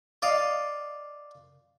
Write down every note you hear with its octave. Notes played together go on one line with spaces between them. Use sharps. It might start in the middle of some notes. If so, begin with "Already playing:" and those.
D5 D#5 F5